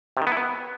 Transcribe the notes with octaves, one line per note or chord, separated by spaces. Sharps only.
C3
D#3
B3
E4
B3